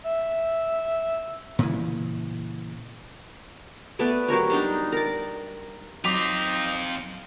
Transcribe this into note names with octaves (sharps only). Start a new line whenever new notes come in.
E5
A#2 C#3 E3
A3 B3 B4 D5
F#3 G4 A#4 C#5
G3 D4 D#4
A#4 D5
F#3 C4 D#4 F4 D6 B6 F7